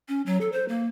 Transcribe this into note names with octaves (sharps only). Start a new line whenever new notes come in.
C#4
F#3
A4
C5
A#3